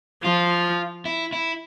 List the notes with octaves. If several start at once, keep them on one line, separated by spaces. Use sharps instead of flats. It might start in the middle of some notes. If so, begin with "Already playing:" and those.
F3 F4
E4
E4